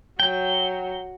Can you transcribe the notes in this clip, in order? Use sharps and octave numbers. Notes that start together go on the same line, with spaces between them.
F#3 G5